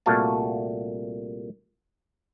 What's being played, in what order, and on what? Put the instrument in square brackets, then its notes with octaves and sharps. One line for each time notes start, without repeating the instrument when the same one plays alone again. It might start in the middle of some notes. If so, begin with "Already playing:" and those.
[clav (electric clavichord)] C2 A#2 A3 F#4 F5 A5